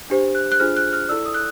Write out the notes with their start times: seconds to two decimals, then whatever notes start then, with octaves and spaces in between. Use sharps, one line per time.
0.10 D4 G4 C5
0.35 F#6
0.52 F#6
0.60 D4 F4 G#4 C5 F6
0.77 F#6
0.93 F6
1.09 E4 A4 D5 E6
1.26 D#6
1.34 F#6